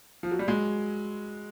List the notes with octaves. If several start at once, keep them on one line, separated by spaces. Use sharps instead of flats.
F3
F#3
G3
F#3 G#3